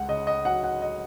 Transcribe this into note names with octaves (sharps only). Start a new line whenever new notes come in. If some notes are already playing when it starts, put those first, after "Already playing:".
Already playing: C#2 F#5
C#3 D#5
D#5
F#3 F#5
F#5
D#5